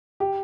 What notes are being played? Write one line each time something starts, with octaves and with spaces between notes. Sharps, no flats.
G4